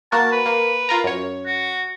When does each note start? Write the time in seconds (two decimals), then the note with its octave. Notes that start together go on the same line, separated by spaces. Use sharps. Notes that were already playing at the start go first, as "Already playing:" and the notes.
0.12 A#3 F#4 A#4 A5
0.32 B4
0.46 A#3
0.89 F4 A#4 A#5
1.04 F#2 C#5
1.46 F#4